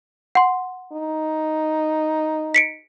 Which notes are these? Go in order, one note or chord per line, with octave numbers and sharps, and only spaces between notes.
F#5 C6
D#4
B6 C#7 D7